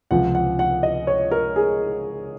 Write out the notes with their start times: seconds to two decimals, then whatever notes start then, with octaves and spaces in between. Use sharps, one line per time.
0.11 C#2 C3 F3 F#5
0.35 F#5
0.59 F#5
0.83 D#5
1.07 C#5
1.31 A#4
1.56 G#4